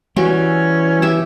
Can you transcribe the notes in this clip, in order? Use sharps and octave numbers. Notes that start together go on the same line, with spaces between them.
E3 G3 C#4 F#4
G4 E5